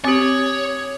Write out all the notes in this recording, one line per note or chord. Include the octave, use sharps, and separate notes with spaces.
C4 G4 C#5 D6 D#6 F#7